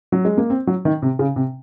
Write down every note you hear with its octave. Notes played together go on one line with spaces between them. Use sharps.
F#3
G#3
A#3
C4
F#3
D#3
C3
C#3
C3